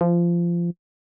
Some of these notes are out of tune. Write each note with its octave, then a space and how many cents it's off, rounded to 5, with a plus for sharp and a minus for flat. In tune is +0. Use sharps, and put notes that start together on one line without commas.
F3 -20